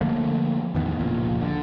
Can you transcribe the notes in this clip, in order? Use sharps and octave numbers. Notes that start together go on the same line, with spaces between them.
D3 F3 A3 A#3
E2 A2 D#3 B3
F1 C#2 A#2 F3
D3